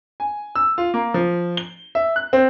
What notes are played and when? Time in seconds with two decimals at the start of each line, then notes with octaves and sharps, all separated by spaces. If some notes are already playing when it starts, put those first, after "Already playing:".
0.20 G#5
0.55 E6
0.78 F4
0.94 A#3
1.14 F3
1.57 G7
1.95 E5
2.16 F#6
2.33 C4